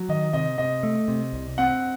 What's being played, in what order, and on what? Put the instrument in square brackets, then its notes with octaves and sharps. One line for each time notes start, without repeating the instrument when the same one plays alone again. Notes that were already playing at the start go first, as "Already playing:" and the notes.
Already playing: [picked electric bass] F#3
[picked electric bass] D#3 [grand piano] D#5
[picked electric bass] C3 [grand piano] D#5
[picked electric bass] C3 [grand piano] D#5
[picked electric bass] A3
C3
C2
[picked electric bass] C4 [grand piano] F#5